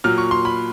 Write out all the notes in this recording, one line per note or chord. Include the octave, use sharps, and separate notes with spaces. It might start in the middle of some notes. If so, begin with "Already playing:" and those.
A#2 F#3 F6
C#6
C6
B5